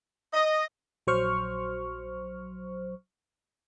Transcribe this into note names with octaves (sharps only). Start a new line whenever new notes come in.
D#5
A#1 F#3 C5 C#6 F6